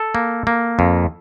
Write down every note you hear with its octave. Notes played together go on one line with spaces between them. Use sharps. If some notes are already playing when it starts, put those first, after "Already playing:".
Already playing: A4
A#3
A#3
F2